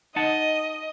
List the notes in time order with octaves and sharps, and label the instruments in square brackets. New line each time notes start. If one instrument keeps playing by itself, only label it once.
[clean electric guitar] D#4 F#5 A5 [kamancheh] D#5